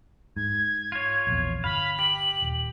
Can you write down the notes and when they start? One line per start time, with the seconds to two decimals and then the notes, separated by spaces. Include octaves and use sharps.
0.37 G#2 G#6
0.92 F4 C#5
1.27 A#1 E2
1.64 G1 F5 B5
1.99 G4 F#7
2.43 D#1